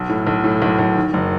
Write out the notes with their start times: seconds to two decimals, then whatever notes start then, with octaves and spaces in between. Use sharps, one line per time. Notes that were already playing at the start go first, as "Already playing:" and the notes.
Already playing: B1
0.09 A2
0.27 B1
0.44 A2
0.62 B1
0.79 B1
0.96 D#3
1.14 F#1